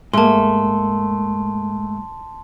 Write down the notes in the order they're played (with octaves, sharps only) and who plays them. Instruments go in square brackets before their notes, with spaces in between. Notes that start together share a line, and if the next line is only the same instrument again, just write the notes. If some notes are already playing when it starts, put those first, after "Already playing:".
[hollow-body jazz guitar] G#2 [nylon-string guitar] A3 A#3 [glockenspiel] A5 C6